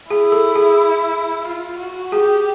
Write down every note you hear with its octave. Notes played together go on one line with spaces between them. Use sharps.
E4 G#4
A4
G#4
F4
F#4
G4 G#4